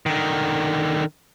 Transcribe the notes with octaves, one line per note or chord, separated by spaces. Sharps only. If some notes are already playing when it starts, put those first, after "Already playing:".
D3 D#3